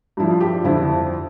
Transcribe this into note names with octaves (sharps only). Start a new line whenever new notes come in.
G2 F3 E4
F4
G4
F2 D3 F3 E4